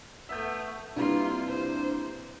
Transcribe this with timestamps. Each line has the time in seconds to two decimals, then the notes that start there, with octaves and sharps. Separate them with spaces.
0.29 A3 B3 E5 G6
0.96 C3 G3 A#3 D4 E4 F4 B4 C6
1.48 C5